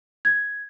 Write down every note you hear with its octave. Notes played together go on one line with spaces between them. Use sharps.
G#6